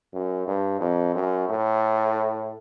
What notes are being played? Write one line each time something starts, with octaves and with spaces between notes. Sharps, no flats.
F#2
G2
F2
F#2
A2